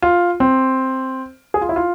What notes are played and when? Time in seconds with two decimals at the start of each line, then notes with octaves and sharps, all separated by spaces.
0.02 F4
0.40 C4
1.54 G#4
1.61 F4
1.69 E4
1.76 F4